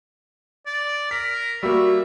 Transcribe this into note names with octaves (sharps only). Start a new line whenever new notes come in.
D5
A#4 B6
G3 A#3 F#4 E5